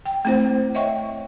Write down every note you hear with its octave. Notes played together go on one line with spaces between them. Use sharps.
G5
A3 C4 E4 C5
C#5 D#5 E5 F#5 G5 C#6